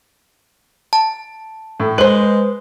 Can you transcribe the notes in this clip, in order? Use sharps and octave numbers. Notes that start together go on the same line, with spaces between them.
A5
A2
G#3 B4 C5 F#7